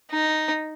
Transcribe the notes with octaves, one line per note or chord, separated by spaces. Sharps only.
D#4